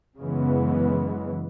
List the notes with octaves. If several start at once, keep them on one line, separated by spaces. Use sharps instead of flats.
F#2 C#3 E3 G#3 B3